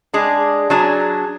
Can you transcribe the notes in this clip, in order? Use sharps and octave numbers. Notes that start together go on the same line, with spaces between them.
G#3 D4 G#4
F#3 D4 G#4